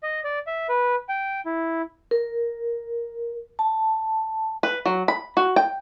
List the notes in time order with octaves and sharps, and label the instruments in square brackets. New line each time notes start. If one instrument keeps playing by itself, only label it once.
[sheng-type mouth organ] D#5
D5
E5
B4
G5
E4
[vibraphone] A#4
A5
[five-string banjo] B4
F#3
B5
F#4
G5